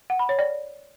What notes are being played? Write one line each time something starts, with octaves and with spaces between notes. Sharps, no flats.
F#5
B5
C#5
D5